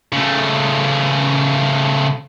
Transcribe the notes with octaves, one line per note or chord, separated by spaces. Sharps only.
C#3 A3